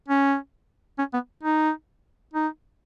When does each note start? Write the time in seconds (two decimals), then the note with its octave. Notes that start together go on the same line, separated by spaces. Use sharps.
0.08 C#4
0.98 C#4
1.13 B3
1.43 D#4
2.33 D#4